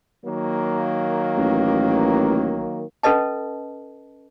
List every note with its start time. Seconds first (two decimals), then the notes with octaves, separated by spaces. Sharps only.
0.24 D#3 F#3 A#3
1.37 A1
3.03 C#4 A4 B4 D#5 A5